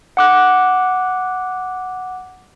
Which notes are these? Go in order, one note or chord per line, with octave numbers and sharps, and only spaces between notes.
F#5 D6 F#6